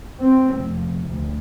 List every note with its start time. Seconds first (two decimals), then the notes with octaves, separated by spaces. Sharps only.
0.19 C4
0.54 F1
1.07 D2